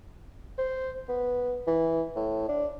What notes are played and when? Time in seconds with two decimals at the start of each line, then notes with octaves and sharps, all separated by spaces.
0.58 C5
1.09 B3
1.67 E3
2.16 A2
2.49 D4